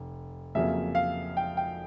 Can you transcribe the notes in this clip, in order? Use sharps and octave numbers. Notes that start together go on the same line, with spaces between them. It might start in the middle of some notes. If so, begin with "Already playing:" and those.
Already playing: F1
F2 C#3 F#3 A#3 E5
F5
G5
G5